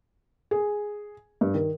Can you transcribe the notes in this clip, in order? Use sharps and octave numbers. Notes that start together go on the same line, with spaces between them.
G#4
G2
D#3